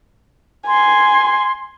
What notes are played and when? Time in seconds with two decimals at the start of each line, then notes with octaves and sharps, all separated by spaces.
0.67 G#5 C6